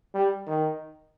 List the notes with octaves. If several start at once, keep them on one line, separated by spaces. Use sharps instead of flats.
G3
D#3